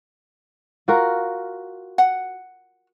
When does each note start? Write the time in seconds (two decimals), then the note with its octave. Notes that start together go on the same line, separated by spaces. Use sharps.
0.88 F4 F#4 A#4
1.98 F#5